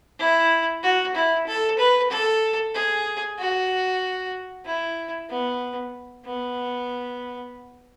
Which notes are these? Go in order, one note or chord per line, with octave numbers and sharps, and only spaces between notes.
E4
F#4
E4
A4
B4
A4
G#4
F#4
E4
B3
B3